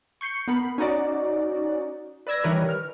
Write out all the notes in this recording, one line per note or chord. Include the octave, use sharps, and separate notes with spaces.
C#6 G6 C7 C#7
B3 A#4 B5
C#4 D#4 F#4 D5
B4 D5 E6 G#6 A#6
D#3 E3 G3 A#4 B4 C#5
F6